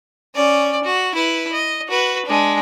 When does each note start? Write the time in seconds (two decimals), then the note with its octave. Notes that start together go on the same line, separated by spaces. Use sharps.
0.35 C#4 D5
0.83 F#4
1.14 E4 B4
1.52 D#5
1.89 F#4 B4
2.25 G#3 D4